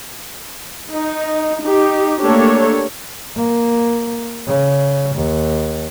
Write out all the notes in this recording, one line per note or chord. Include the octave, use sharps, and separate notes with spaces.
D#4
D#4 G4
A3 A#3 D4 G4 A4 C#5
A#3
C#3
D#2